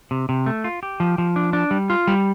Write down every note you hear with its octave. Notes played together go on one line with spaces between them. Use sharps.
C3
C3
A3
F4
G4
F3
F3
D4
D4
G3
F4
G3